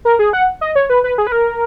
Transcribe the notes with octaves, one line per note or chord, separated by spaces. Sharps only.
A#4
G#4
F#5
D#5
C#5
B4
B4
G#4
B4
A#4